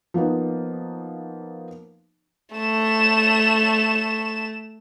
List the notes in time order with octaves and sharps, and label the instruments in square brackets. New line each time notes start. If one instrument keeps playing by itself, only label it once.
[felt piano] F3 A#3 B3 D#4
[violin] A3 E7